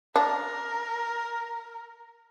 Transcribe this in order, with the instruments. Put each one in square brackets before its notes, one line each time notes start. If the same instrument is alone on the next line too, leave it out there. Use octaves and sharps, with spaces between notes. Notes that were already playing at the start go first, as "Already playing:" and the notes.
[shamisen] D4 [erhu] A#4